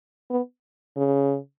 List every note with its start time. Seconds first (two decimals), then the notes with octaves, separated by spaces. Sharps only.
0.30 B3
0.97 C#3